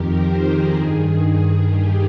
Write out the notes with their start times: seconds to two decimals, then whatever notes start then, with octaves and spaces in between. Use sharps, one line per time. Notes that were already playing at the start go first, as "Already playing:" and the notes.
Already playing: F2 D#3 G4 A#4
0.14 C5
0.44 G#4
0.73 G2 D#3 G#4
1.62 G4